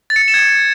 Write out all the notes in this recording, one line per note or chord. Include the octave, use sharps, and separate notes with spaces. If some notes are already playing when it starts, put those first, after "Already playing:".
A6
C#7
A6
E7
G#6